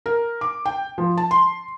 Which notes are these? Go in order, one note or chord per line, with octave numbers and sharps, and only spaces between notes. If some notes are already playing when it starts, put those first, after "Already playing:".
A#4
D6
G5
F3
A5
C6